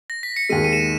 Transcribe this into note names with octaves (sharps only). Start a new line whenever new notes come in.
A#6
B6
C#7
D#2 D#3 G#3 D#7
D#7
E7
D#7